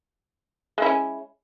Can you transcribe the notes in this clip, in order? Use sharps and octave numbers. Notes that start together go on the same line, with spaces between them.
G#3 C#4 E4